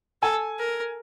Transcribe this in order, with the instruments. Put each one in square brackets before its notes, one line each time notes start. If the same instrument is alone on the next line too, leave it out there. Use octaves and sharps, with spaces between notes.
[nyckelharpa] A4 [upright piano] G#5
[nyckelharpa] A#4